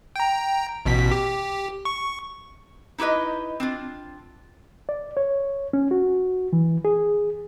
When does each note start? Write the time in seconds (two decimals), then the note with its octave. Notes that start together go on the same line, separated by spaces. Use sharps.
0.16 G5 A#5
0.86 A1 B2 B6
1.11 G4
1.85 C#6
2.98 D#4 E4 G4 B4 D#5
3.60 C4 D4 F4
4.89 D5
5.17 C#5
5.73 C#4
5.91 F#4
6.53 E3
6.85 G#4